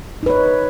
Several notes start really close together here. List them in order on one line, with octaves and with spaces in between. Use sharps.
D#4 B4 C#5